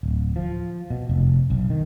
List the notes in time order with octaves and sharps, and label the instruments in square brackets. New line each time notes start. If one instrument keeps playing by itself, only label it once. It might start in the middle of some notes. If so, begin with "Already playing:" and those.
[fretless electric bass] D1
F3
B2
F1
B1
D#3